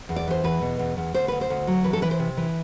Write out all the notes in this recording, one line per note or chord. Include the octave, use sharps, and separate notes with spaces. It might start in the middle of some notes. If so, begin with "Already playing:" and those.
E2
D5
E3 C5
E2 B4
B2
E2
E2
D2 C5
D2 B4
C5
D2
F#3
E3 B4
A4
E3 B4
C5
C3
E3